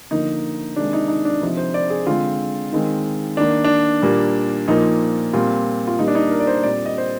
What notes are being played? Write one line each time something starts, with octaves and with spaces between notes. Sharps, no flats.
D3 F3 A#3 D#4
C3 D#3 G#3 D4
D#4
D#4
D4
C3 F3 C4 D#4
C5
D5
G#4
D3 G#3 C4 F4
D#3 G#3 C4
D#3 A#3 D4
D4
A#2 G3 A#3
A#2 F3 A#3 D#4
A#2 G3 C4 F4
F4
A#2 G3 A#3 D#4
D4
D#4
A#4
D5
C5
A#2 G3 C4 D5
D#5
C5